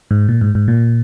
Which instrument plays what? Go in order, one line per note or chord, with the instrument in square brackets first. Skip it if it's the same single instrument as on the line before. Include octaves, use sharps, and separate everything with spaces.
[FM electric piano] G#2
A#2
G#2
G#2
A#2